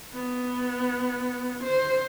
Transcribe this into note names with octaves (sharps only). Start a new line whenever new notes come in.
B3
C5